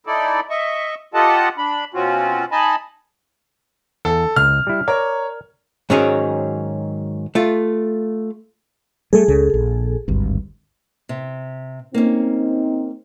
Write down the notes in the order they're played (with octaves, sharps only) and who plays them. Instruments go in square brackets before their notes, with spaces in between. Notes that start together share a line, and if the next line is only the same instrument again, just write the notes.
[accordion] D#4 E4 A4 D5
D#5 E5 C#6
F4 G4 A4 D#5 F#5 A5
D4 B5
B2 C4 C#4 F4 F#4
D#4 D#5 G#5 A5 B5
[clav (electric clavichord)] E2 [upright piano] A4
[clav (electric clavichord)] C#2 [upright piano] F6
[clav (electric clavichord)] G3 E4
[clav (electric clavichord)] A#4 D5 [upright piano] C#5
[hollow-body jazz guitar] G#2 D#3 F#3 C#4 F#4 G#4
A3 F4
[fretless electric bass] G3 A3 [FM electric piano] G#4 A4
[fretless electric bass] C#2 C#3
A#1
G#1 D2 G2
[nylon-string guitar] C3
[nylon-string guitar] A#3 C#4 [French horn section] C4 D#4